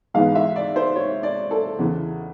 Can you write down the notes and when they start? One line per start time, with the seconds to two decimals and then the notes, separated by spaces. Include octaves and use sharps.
0.14 G#2 E3 G#3 B3 F5
0.35 E5
0.56 D5
0.76 C5
0.96 C#5
1.23 D5
1.51 A4
1.79 E2 C#3 E3